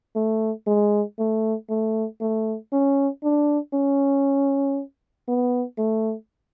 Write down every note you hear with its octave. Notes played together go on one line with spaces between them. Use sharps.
A3
G#3
A3
A3
A3
C#4
D4
C#4
B3
A3